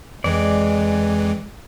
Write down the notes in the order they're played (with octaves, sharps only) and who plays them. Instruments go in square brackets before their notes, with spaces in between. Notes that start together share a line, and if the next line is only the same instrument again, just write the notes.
[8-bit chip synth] F2 E3 [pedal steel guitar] G#3 D5